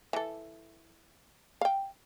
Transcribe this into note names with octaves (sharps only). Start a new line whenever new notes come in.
E3 A4
F5 G5